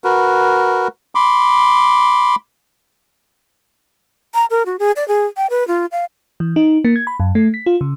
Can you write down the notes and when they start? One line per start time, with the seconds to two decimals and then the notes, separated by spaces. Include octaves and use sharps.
0.04 F#4 A#4 B4
1.15 B5 C6 D6
4.34 A#5
4.50 A#4
4.66 F#4
4.79 G#4
4.96 D5
5.08 G#4
5.37 G5
5.50 B4
5.68 F4
5.92 F5
6.40 E3
6.56 D#4
6.85 A#3
6.96 G#6
7.07 B5
7.20 F#2
7.35 A3
7.54 B6
7.66 F4
7.81 C#3